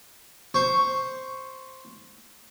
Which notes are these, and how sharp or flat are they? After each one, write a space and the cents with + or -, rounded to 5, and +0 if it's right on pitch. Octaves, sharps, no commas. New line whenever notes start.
C5 +0 C#6 +0